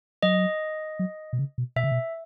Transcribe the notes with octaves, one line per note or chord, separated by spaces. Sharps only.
F#3 D#5
F#3
B2
C#3
B2
B2 E5
C#3
B2